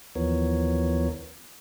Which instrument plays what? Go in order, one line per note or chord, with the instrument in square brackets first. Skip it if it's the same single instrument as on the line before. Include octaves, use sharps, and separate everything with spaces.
[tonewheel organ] D#2 E3 F3 B3 A#4 C#5